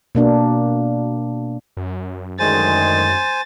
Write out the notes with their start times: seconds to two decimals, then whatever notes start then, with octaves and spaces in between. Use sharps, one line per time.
0.15 B2 A#3 D4
1.77 F#2
2.39 D2 D#3 G#3 C5 G#5 A6